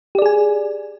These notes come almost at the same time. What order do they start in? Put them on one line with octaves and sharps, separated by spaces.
G4 D5 G#4 G#5